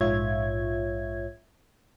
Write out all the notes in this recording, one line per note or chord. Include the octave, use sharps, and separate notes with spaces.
A#1 G#2 F4 C#5 E5 G#6